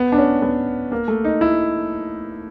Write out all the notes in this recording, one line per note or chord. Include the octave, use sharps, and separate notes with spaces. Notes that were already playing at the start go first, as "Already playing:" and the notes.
Already playing: B3
D4
C#4
B3
A#3
A3
D#4
E4